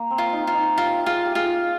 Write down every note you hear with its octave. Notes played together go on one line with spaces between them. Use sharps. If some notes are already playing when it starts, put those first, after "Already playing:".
Already playing: A#3
C4
F4
D#4
F4
D#4
F4 G4
F4 G#4
G4
F4 G#4